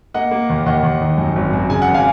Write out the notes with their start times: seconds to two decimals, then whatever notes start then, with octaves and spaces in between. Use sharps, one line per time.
0.14 A#3 D#5 F#5
0.31 A#3
0.50 D#2
0.66 D#2 D#5 F#5
0.83 D#2
1.01 D#3
1.18 F#2
1.36 G#1
1.53 F#2
1.69 C#3 G#5
1.82 F#5
1.87 G#1
1.94 F5 G#5